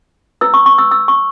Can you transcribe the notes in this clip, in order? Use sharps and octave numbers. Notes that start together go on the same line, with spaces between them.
E4 B4 E6
C#6
C#6
E6
E6
C#6